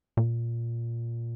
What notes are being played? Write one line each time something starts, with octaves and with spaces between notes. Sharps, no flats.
A#2